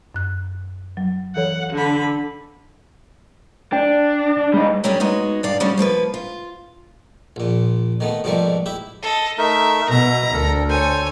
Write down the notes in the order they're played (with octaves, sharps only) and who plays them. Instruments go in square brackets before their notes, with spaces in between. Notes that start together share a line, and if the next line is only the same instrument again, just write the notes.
[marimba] F#2 F#6
F#3
[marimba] E3 A4 C#5 [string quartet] F#5
[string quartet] D3 B5
[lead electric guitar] D4 [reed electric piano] G5
[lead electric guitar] G3 D#4 [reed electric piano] G#3
[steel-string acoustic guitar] F#3 G3 A#3 C#4 G4 G#4
G#3 B3 D#4 F#4
G2 D5 F5
C#3 G3 C#4 F#4
F3 A#3 A#4 B4
F4
[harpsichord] A#1 A#2
D#3 A3 B3
G#2 B2 F3 G3 A3 A#3
E4 G4 E5
[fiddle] A4 D#5
[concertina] A3 D#4 A#4 [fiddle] E5
[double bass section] B2 [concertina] E5 [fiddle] A#5
[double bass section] D2 [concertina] A4 A#4
[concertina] A4 C5 [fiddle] C#5 G#5